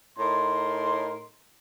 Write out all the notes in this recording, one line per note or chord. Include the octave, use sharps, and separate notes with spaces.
A2 D#4 A#4 C6